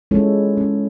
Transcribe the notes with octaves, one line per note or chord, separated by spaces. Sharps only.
G#3 C#4 E4 F4 A4 C#5
C#4